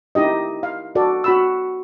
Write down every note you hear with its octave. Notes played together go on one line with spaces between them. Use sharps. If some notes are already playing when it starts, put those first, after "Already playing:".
D#4 E4 G4 D#5
F5
F#4 A4 D5
F#4 B5 E6